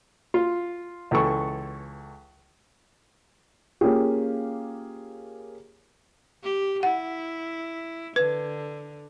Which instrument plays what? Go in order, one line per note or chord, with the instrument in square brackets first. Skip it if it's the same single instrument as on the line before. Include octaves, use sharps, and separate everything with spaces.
[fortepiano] F4
C#2 E3 A4 C#6
[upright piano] A#3 C#4 F4 G4 G#4
[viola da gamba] G4
[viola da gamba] E4 [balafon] F#5
[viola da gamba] D3 [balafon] B4